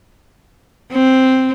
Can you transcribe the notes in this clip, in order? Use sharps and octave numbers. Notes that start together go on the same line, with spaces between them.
C4